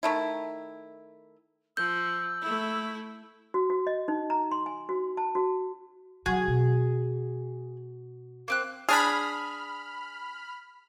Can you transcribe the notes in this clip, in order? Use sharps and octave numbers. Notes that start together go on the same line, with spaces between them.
D#3 A3 E4
F3 E6 G6
A3 E4
F#4
F#4
D#5
D#4
A#5
C6
G#5
F#4
A5
F#4
D3 F#3 F#4 G#4
B2
A#3 C4 F#6
D4 G#4 B5 F6